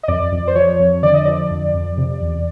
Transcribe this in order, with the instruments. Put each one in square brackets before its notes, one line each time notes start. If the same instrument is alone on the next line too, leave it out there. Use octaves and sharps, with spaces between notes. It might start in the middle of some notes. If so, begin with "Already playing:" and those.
[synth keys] D#5
F2 D5
F2
C5
F3 C#5
F2
D3 D5
D#5
F3 D5
F2
F2
C3
E2